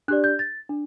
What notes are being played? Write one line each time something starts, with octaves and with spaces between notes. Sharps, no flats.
D4 G4 D5 F#6
G6
A6
D4